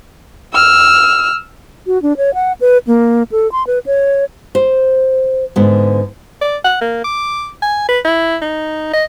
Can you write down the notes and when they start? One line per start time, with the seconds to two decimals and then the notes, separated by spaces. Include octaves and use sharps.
0.54 E6 F6
1.87 F#4
2.02 D4
2.17 C#5
2.34 F#5
2.61 B4
2.87 A#3
3.32 A4
3.52 C6
3.67 B4
3.86 C#5
4.55 C5
5.56 G#2 D3 B3
6.41 D5
6.65 F#5
6.81 A#3
7.04 D6
7.62 G#5
7.89 B4
8.05 E4
8.42 D#4
8.93 D#5